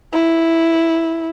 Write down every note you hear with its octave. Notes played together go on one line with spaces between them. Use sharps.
E4